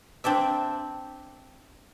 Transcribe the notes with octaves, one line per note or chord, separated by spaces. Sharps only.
C4 D4 D5 E5